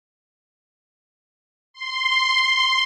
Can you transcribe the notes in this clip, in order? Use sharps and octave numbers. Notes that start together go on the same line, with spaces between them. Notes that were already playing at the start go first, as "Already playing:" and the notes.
C6